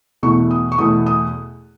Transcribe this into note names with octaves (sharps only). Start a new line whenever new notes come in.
E2 B2 A3 C#6
D#6
C#6
E2 B2 A3 D#6
D#6